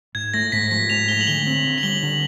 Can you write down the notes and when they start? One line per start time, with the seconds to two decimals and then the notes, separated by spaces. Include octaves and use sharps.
0.15 G#2 G#6
0.34 A3 A#6
0.52 G#2 B6
0.71 F3 B6
0.90 G#2 F7
1.08 A3 G7
1.21 F#7
1.27 D3 G7
1.47 C4
1.65 D3
1.78 F#7
1.83 G3 G7
2.02 D3